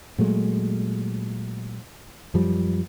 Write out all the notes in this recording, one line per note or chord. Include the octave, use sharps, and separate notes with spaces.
A#2 F#3 G#3 A3
F#2 F3 G3